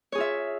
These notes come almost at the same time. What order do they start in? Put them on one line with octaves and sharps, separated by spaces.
C#5 G#4 F4 E5